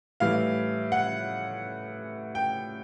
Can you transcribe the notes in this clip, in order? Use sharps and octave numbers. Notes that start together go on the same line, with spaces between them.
A2 E3 G3 F5
F#5
G5